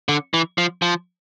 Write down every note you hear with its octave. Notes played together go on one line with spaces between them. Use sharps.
D3
E3
F3
F3